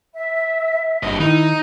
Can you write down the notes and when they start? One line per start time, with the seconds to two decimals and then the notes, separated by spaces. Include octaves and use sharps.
0.14 E5
1.03 F#1 G2 D#5
1.20 D#3 D#4 E4